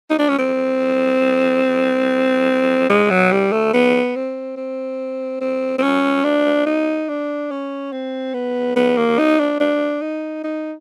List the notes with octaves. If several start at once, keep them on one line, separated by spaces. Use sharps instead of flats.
D#4
D4
C#4
C4
G#3
F#3
G3
A3
B3
C4
C4
C4
C4
C#4
D4
D#4
D4
C#4
C4
B3
B3
A#3
D#4
D4
D4
D#4
D#4